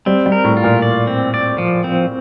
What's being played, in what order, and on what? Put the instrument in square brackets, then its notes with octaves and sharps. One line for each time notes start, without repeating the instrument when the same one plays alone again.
[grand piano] G3 [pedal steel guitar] C4
[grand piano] G3
[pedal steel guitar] A#4
[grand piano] A2
[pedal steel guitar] F4
[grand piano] A#2
[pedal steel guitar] D5
C4
D5
F3
C4